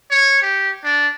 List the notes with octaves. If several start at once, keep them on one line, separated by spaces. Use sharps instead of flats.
C#5
G4
D4